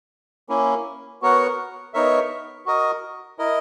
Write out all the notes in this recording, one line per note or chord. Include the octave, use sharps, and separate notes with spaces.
A#3 C#4 E4
B3 F#4 A#4 C#5 F#5
B3 D#4 A#4 C#5 E5
F#4 A#4 D#5
E4 A#4 D#5